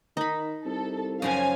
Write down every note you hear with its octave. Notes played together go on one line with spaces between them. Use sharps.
D#3 D#4 B5
C2 A4
F#2 C#3 F3 F5 G#5